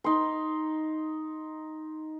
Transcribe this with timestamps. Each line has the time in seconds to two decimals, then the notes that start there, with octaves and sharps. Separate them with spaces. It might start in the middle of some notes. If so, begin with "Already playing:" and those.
0.04 D#4 C6